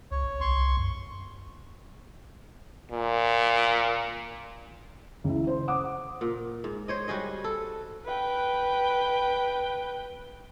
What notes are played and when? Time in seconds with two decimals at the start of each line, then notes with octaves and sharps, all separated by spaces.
0.11 C#2 C#5
0.25 A#1
0.41 C2 C6 C#6
0.78 F#2
2.91 A#2
5.24 C#2 E4
5.47 C5
5.68 F#5 D6 D#6
6.21 A#2
6.64 G#2
6.88 C5 C#5 D#5
7.08 G3 F#4 G#4 D#5
7.44 A4
8.05 B4 G5